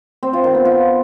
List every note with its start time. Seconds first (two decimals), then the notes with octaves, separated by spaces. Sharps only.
0.23 C4
0.33 F4
0.44 D#3
0.55 B3
0.65 F4